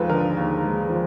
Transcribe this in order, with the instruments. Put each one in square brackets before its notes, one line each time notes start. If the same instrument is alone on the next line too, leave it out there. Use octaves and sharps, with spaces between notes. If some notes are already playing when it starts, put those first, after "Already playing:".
Already playing: [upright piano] D#2 F3 G#3 A4 B4
D3 A#4
D#2
G#3
F3